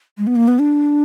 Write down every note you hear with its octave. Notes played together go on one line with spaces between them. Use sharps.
G#3
B3
A#3
B3
D4